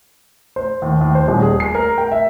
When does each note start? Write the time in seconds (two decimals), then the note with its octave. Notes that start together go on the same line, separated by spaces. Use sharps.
0.56 C5
0.82 D#2
1.01 D#2
1.15 C5
1.28 D#1
1.42 G#4
1.60 C7
1.75 A#4
1.98 G5
2.12 E5